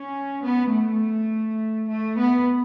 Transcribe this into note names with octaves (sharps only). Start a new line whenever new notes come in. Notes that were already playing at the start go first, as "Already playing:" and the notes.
Already playing: C#4
B3
A3
A3
B3